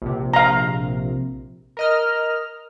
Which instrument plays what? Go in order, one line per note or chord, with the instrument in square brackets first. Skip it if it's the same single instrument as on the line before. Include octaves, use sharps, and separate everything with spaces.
[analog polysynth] A#1 C3
[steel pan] F5 A#5
[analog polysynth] A#4 D#5 F6